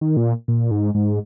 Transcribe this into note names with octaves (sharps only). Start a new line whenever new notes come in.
D#3
A#2
A#2
G#2
G#2